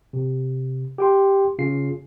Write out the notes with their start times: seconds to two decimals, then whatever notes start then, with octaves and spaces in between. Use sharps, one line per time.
0.13 C3
0.98 G4 G5 C6
1.59 C#3 F4 C7